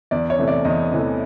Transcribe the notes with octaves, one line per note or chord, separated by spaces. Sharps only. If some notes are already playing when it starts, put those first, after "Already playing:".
E2 D5
C#5
C3 E3 A3
D5
E2 D#5
C3 E3 A3